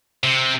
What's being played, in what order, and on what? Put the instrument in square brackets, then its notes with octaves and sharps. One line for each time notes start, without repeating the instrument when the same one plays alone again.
[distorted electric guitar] C3